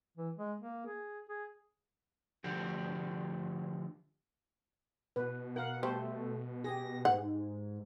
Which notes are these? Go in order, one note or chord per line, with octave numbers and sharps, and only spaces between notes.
E3
G#3
A#3
G#4
G#4
D3 F3 A3 F#4 G4
B2 B4
A#4 F5 F#5
G3 A3 C5
G4 G#4 A#6
G#2 F#5